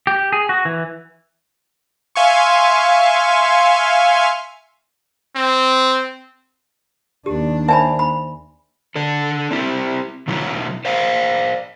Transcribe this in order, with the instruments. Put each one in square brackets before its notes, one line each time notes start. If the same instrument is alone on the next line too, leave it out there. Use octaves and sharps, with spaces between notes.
[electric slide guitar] G4
G#4
F#4
E3
[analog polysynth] E5 F5 G#5 C6 C#6
[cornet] C4
[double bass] D#2 D4 [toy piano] G4
[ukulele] C5 C#5 A5 [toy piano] E5 G#5 B5
[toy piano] B5
[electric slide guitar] D4 A4
C4 E4 F#4 G4
B2 D3 F#3 C#4 E4 F#4
C5 D5 F5